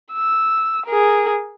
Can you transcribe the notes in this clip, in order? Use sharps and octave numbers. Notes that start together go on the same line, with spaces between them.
E6
G#4 A#4